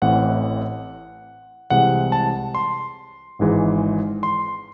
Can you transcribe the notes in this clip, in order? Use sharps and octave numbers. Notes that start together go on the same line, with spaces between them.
A1 A2 E3 C4 F#5
C2 C3 E3 G#3 F#5
A5
C6
G#1 G#2 E3 G#3
C6